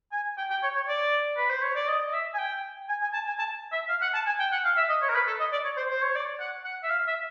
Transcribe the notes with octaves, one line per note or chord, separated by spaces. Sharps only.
G#5
G5
G5
C#5
C#5
D5
B4
C5
C#5
D5
D#5
D#5
E5
G#5
G5
G#5
G#5
A5
G#5
A5
E5
F5
F#5
A5
G#5
G5
F#5
F5
E5
D#5
C#5
A#4
B4
A4
D#5
D5
C#5
C5
C5
C#5
D5
F#5
F#5
E5
F5
E5